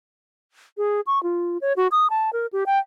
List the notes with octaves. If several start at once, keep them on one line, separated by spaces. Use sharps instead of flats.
G#4
C#6
F4
C#5
F#4
D#6
A5
A#4
G4
G5